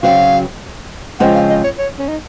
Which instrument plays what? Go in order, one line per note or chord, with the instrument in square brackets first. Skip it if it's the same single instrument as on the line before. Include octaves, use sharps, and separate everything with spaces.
[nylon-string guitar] C#3 F#3 C4 F#4 [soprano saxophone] F5
[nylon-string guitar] C#3 F3 G#3 C4 [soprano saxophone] F#5
[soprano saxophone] F5
D#5
C#5
C#5
C#4
D#4